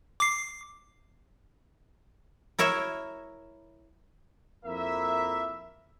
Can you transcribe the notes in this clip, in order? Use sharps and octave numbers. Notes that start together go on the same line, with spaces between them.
D6 C7
E4 A#4 C#5 E5
F2 A#3 E4 A#4 E5